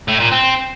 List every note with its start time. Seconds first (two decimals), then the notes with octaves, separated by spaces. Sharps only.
0.08 A2
0.20 A#2
0.32 C4